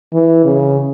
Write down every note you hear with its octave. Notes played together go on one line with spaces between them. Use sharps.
E3
C#3